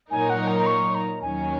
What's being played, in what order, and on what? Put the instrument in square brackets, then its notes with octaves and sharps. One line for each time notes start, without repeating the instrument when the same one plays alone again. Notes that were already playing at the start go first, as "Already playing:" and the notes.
[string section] A#2 F#3 D#4 A#4 C#5 [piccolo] G#5
[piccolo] F#5
A#5
A#5
C#6
A#5
[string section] D#2 D#3 F#3 C#4 [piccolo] G#5